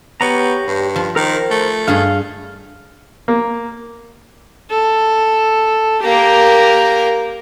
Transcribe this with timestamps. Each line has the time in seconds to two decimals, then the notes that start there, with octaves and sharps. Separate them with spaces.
0.21 B3 G4 C#5 A#5
0.67 G2
0.96 F3
1.16 D#3 A#4 C5
1.50 A3
1.88 G2 G#4 F5
3.28 A#3
4.71 A4
6.03 A#3 G4 A#4 A#5